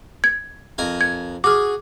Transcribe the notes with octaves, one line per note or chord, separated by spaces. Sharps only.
G#6
F2 A#4 G#5
G#6
F#4 G#4 D6 F6